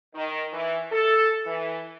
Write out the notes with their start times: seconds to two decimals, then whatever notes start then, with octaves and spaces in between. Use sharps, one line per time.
0.15 D#3
0.53 E3
0.91 A4
1.45 E3